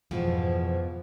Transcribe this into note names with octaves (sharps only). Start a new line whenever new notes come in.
F2 G#2 B2 E3 F3